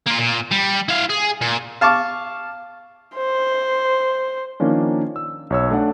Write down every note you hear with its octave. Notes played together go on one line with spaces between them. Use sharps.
A#3 F4
A#2
G3
E4 F5
G#4
A#2
F5 A5 C#6 D6
C5
D#3 F3 A#3 C#4 D4
E6
B1 C#5 E6
A3 D4 F#5